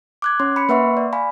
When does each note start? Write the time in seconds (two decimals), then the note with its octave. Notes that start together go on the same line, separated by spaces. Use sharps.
0.22 D6 F#6 G#6
0.40 C#4 C#5 C6
0.56 B5 C#7
0.69 A#3 B4 E5 F#5 C6 C#6
0.97 D5
1.13 F5 G#5 B5